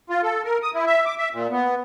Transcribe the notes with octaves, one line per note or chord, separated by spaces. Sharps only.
F4
A4
A#4
D#6
E4
E5
D6
E5
A#2
B3